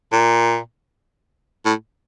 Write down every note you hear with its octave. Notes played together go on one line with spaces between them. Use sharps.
A#2
A2